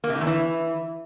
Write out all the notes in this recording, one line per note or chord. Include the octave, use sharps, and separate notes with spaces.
A#3
C3
A2
E2
E3